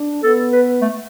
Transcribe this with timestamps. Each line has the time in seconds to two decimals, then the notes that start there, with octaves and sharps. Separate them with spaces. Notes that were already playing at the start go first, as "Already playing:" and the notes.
Already playing: D4
0.23 B3 A4
0.52 B4
0.81 A3